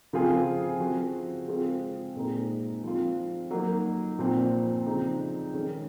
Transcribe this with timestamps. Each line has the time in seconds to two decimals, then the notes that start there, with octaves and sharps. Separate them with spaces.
0.13 C#3 F3 C4 F4 G#4
0.80 F3 C4 F#4
1.48 G#3 C4 F4 G#4
2.16 A#2 G#3 C4 D#4 G#4
2.84 F3 C4 F4
3.51 F#3 A#3 D#4
4.18 A#2 F3 C4
4.86 C#3 F3 C4 D#4
5.54 D#3 G#3 C#4